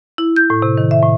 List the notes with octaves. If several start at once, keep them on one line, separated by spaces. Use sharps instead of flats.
E4
G6
A2
C3
D#3
E5
A2